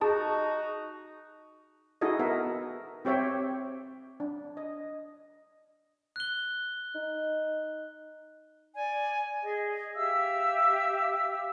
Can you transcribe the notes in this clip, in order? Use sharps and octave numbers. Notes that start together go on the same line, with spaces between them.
D#4 F#4 G#4 A5
D#4 E4 F#4 G#4 A4 D#5
B3 A#4 E5 F#5
C4 G4 C#5 E5 G5
D4
D#5
F#6 G7
D#4
D5 G#5
G#4 D#5
G4 E5 F5 E6